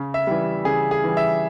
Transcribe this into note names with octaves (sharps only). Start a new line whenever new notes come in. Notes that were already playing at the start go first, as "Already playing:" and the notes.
Already playing: C#3
E5
E3 G3
C#3 G#4
G#4
E3 G3
E5